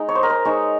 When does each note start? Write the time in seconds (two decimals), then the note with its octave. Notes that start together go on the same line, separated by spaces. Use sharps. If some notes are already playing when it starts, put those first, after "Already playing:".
Already playing: G#3 D#4
0.09 C#5
0.15 C5
0.23 A#4
0.30 C5
0.45 G#3 D#4 C#5